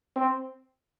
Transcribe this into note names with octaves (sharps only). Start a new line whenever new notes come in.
C4